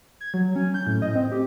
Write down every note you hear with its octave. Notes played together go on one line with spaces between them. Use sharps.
G#6
F#3
C#4
G6
A2
D#5
C4
G4